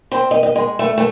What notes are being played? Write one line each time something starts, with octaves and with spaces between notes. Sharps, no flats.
C4
D#5
D#5
G#3
A3
A3